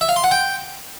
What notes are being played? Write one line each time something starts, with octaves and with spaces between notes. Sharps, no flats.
E5
F5
C6
F#5
G5